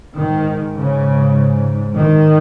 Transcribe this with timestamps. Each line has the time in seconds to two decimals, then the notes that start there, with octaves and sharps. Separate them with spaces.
0.15 G#2 D#3
0.75 C#3
1.95 D#3